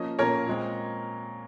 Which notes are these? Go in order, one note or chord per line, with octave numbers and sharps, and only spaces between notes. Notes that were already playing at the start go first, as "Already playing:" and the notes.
Already playing: F3 A#3 C#4 D#5
A#2 F3 A#3 C#4 A#4 C#5
A#2 G#3 C4